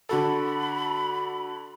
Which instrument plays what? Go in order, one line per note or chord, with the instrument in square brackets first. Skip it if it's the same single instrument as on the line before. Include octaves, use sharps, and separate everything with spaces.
[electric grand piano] D3 F#4 A4 [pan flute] B5